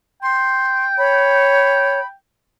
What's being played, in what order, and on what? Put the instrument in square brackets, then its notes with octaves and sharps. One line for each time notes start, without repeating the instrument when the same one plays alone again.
[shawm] G5 [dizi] C6
[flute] C#5 [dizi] B5